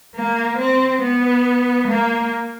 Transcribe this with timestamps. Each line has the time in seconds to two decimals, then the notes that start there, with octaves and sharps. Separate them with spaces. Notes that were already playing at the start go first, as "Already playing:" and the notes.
0.15 A#3
0.58 C4
1.02 B3
1.88 A#3